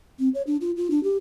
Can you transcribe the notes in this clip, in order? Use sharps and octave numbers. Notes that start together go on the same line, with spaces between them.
C4
C#5
D4
F4
F4
D4
G4